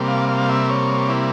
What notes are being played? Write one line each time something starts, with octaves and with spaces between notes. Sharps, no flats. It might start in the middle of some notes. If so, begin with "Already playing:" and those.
Already playing: C3 G3 A#3
F5
F5
E5
C#5
E4